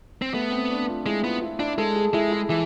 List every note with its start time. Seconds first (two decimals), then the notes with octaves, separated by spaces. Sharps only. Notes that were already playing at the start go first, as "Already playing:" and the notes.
0.22 C4
0.34 A3 B3
0.52 C4
0.70 D4
0.88 F4
1.06 G#3 E4
1.24 B3 F4
1.42 E4
1.60 D4 E4
1.78 G#3 A4
1.96 G#4
2.14 G#3 E4
2.32 E4
2.50 E3 E4